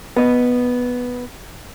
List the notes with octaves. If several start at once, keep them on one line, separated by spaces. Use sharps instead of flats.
B3 D#5